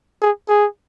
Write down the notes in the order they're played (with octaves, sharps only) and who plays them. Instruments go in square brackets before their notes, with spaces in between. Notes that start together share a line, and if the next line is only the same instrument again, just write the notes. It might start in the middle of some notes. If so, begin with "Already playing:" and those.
[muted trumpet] G#4
G#4